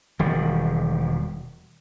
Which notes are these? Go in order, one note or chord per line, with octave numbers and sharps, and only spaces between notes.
E1 D#3 G3